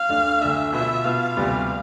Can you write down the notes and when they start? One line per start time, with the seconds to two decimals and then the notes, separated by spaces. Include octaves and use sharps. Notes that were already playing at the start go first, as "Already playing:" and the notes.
Already playing: F5
0.09 D2 D3 A3 D4
0.41 D2 D3 A3 D4 E5
0.73 B2 B3 F4 E5
1.05 B2 B3 F4 F5
1.37 D2 C3 G3 B3